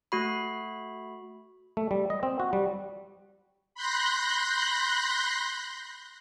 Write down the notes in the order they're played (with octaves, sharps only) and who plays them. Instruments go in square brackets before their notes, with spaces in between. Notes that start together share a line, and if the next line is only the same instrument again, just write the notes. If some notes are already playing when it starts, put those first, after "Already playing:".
[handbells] A3 F#4 B5
[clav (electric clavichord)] A3
G3
D#5
C4
F#4
G3
[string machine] B5 C6 F#6 G6 A#6